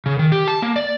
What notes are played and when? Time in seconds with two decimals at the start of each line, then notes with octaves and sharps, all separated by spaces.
0.06 C#3
0.19 D#3
0.32 G4
0.48 A5
0.62 A#3
0.76 D5